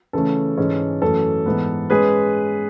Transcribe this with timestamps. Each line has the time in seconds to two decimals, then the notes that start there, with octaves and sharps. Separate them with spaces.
0.13 C#3 E3 A3 C#4 A4
0.57 G#2 E3 G#3 C#4
1.02 F#2 E3 A3 C#4 A4
1.46 G#2 E3 B3
1.90 G#3 C#4 G#4 B4